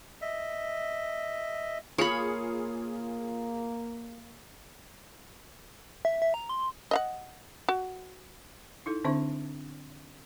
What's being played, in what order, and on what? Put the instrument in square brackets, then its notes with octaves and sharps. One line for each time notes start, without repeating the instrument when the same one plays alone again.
[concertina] D#5 E5
[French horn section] A#3 [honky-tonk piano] F4 G#4 C#7 [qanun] C#5 B5
[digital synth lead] E5
E5
A#5
C6
[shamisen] D#5 F5 F#5
F#4
[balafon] D#4 E4 A4
D3 C4 D4 C5 E5 C#6